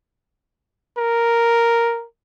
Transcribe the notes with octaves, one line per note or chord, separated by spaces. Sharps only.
A#4